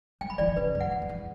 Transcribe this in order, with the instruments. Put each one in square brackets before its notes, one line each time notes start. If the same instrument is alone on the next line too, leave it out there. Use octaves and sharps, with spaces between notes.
[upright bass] G3 [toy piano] G5
[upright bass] F#3 [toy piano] B5
[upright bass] E3 [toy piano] D5
[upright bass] D3
[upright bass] C#3 [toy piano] B4
[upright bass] F#2
[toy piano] F#5
[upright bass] E2
F#2
E2